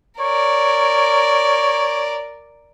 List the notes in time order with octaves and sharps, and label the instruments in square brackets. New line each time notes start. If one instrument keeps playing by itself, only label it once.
[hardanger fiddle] A#4 D5 [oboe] C#5